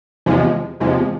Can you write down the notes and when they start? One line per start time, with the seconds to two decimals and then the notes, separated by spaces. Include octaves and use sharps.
0.26 E2 C3 F3 G#3
0.80 E2 C3 F3 G#3